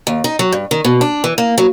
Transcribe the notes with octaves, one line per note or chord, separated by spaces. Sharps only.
D#2
D#4
F#3
G2
D#3
B2
D4
E3
A#3
F#3